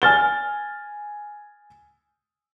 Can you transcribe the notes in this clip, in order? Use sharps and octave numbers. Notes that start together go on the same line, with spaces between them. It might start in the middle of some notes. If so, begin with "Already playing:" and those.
G#5 F6 A6 G7